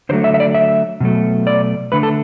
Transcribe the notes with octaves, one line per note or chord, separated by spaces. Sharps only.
D3 F#3 A3 C5
E5
E5
D5
E5
B2 F#3 A3
D5
D3 A3 B4
A4